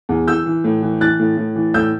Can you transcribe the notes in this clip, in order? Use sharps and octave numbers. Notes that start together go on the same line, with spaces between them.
E2
E3 E6 G6
E3
A2
E3
E3 F#6 A6
A2
A2
E3
A2 E6 G6